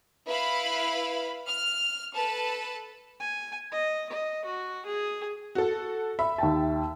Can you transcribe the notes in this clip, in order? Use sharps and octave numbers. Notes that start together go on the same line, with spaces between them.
E4 B4 F5 B5
F6
A4 B4 A5
G#5
D#5
D#5
F#4
G#4
F#4 A4
E5 B5
D#2 G5 A5